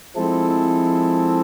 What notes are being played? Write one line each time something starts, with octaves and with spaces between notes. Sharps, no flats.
F3 G#3 C4 E4 A4